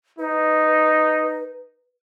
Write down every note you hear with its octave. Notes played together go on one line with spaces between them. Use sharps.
D#4 B4